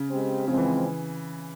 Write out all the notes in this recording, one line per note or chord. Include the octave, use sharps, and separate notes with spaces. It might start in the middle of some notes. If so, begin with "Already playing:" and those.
Already playing: C#3
G#3 C4 G4
C#3 F3 G#3 C4
E3